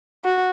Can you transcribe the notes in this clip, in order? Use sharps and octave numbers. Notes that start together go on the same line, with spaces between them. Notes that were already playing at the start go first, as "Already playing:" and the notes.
F#4